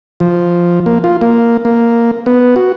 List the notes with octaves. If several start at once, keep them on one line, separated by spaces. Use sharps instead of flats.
F3
A#3
F4
A#3
A#3
B3
F#4